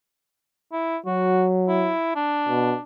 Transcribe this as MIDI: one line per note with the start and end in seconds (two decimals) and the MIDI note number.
0.72 0.97 64
1.06 1.93 54
1.06 1.45 66
1.68 2.14 64
2.16 2.83 62
2.49 2.75 47